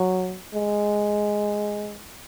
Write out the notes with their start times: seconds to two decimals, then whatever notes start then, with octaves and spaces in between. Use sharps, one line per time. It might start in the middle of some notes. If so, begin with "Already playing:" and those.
Already playing: F#3
0.54 G#3